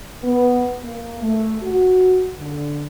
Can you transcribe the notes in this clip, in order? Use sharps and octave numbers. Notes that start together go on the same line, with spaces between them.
B3
A#3
A3
F#4
D3